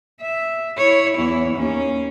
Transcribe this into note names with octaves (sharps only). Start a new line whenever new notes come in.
E5
E4 C#5
E2 E4
D#2 C#4